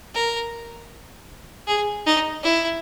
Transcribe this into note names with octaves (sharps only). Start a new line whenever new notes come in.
A#4
G#4
D#4
E4